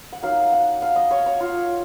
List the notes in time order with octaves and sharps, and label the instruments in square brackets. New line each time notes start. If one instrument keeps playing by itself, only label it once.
[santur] F#5
F#3 A#3 D#4 F5
F#5
F5
D#5
C#5
C#5
F4